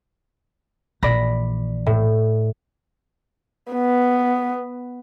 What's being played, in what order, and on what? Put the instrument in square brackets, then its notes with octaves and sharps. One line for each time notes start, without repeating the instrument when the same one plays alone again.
[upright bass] A#1 E3 [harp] D5 B5 A#6
[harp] A2
[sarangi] B3